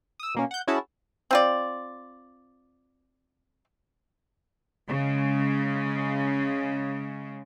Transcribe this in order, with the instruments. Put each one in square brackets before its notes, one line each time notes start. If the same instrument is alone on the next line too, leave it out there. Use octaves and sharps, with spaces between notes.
[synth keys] D#6 E6
B2 A#3 C#4
F#5 G6
C#4 E4 F#4 G#4 A5
[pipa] C4 F4 D5
[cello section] C#3 G#3